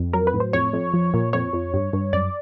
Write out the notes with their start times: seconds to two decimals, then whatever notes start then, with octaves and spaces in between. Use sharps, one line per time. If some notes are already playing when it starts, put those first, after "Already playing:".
Already playing: F2
0.13 F#3 A#4
0.27 B4
0.34 A2
0.40 C5
0.53 F2 C#5
0.73 F2
0.94 F3
1.14 A#2
1.33 F2 C#5
1.53 F2
1.74 G2
1.93 G2
2.13 F#2 D5